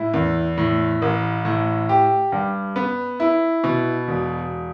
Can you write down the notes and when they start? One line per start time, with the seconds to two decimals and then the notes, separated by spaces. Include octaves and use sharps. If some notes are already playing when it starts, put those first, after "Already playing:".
Already playing: A2 E4
0.14 E2
0.58 A2
1.02 A1
1.45 A2
1.89 G4
2.32 G2
2.76 B3
3.20 E4
3.64 B2
4.08 E1